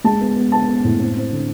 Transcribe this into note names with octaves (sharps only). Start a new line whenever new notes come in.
G#3 A5
B3
B3
B3 A5
B3
A2
C4
C4
D3